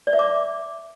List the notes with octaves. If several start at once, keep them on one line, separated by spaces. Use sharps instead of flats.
D5
E5
D6